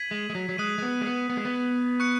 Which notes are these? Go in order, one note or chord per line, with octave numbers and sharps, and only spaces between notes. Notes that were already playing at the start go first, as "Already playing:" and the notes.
Already playing: G#6 B6 D#7 F#7
G#3
G#3
F#3
F#3
G#3 D#6 F#6 D#7 F#7
G#3
B3
G#3
B3
B3
G#3
B3
C#6 F#6 C#7